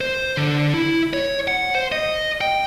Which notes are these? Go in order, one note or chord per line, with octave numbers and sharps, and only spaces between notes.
C5
D3
E4
C#5
F#5
C5
D#5
G5